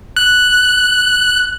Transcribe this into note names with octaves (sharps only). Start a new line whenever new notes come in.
F#6